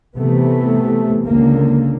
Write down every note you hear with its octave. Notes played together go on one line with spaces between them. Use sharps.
C3 E3 A3 B3
C#2 D3 A#3